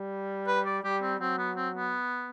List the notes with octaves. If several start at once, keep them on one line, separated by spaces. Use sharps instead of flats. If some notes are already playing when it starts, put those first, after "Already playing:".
Already playing: G3
B4
D5
G3 G4
C4
F#3 C4
B3
C4
B3